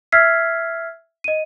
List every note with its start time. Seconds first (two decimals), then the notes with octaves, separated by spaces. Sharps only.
0.12 E5 E6 F6 G#6 B6 C7
1.24 D#5 D#7